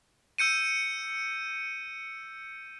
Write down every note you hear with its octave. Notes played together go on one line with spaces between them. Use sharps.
E6 G6 C#7 D#7